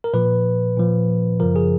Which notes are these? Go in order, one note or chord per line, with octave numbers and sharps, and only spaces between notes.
A#4
A#2 F3 B4
A#2 F3
F#2 C#3 F3 A#4
G#4